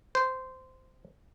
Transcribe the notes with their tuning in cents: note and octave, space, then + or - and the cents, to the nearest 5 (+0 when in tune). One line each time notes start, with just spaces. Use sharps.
C5 -15